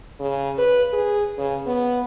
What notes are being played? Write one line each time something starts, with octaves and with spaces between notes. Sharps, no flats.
C#3
B4
G#4
C#3
B3